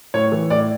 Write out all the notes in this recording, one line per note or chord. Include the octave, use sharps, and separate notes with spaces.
A2 C#5
E3
A2 D5